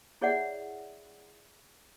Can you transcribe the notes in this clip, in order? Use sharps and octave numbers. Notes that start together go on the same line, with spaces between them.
E4 G#4 C#5 D5 E5 F#5